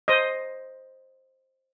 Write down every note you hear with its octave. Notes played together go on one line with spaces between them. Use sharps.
C5 D#5